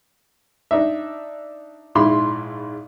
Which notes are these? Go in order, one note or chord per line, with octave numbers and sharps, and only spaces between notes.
D4 D#4 E5
A#1 G#2 E4 B5 C6